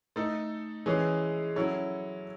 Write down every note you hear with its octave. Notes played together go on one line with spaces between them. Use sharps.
A3 D#4 A4
E3 G#3 C#4 G#4
F#3 C#4 E4 A4